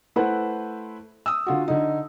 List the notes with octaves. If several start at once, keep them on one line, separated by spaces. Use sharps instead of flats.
A3 E4 B4 C5 F#5
D#6 E6
D3 F4 F#4
D3 D#4